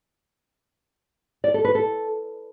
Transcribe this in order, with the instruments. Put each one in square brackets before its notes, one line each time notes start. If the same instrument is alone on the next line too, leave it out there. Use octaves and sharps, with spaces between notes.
[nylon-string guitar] D5
A4
B4
A4